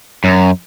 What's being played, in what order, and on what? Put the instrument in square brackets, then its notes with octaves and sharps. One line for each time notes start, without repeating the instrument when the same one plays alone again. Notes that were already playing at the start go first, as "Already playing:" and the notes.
[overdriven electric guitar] F#2